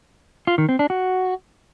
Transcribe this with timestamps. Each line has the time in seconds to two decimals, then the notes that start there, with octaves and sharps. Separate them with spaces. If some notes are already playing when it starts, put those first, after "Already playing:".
0.47 F4
0.58 D#3
0.69 C4
0.79 D4
0.90 F#4